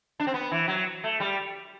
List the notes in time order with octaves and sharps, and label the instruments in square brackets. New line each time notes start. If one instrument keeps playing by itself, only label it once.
[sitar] D4
C4
B3
E3
F#3
A3
G3